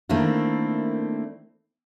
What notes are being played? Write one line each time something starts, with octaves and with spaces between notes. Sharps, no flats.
D#3 A3 A#3 C4 D4 E4